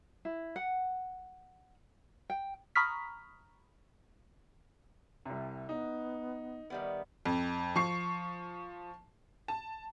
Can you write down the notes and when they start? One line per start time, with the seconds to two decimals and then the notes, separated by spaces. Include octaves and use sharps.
0.25 E4
0.56 F#5
2.30 G5
2.76 A#5 B5 C#6 D#6 F6 B6
5.26 C2 C3
5.69 B3 D#4
6.70 D#3 G3 B3 E5
7.25 F2
7.76 F3 C#6 C7
9.48 A5